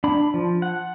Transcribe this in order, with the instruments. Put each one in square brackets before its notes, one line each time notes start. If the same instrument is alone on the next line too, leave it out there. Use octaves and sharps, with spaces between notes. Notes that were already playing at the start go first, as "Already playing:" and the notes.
[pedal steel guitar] D4 B5
F3
F#5